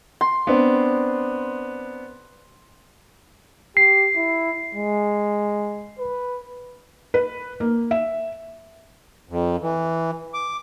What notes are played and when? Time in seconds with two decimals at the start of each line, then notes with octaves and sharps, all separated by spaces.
0.21 C6
0.47 B3 C4 D4
3.77 G4 C7
4.16 E4
4.75 G#3
5.99 B4
7.14 B4
7.60 A#3
7.91 E5
9.29 F2
9.62 E3
10.34 D6